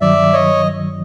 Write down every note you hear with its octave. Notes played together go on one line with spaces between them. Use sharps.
G2 D#3 F#3 D5 E5
C#5 D#5